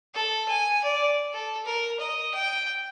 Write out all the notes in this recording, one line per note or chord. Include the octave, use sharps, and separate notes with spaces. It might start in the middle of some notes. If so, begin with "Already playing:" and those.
A4
G#5
D5
A4
A#4
D#5
G5